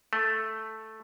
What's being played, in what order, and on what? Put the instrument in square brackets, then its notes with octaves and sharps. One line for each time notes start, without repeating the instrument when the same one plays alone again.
[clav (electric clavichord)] A3